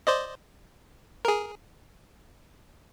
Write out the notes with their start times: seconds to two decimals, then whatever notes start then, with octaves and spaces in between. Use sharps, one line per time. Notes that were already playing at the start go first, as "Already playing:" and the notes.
0.07 C5 D5 D#5
1.25 G#4 A#4